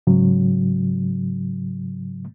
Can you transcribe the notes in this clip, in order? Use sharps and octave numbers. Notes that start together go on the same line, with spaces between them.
G#2 C#3 F#3